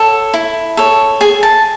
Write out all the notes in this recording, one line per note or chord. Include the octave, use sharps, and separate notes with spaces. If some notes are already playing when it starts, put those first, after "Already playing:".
Already playing: A4 C#5 F#5
E4
A4 C#5
G#4 G#5
A5